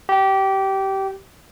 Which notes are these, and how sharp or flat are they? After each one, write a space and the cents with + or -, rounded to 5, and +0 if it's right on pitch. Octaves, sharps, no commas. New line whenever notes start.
G4 -20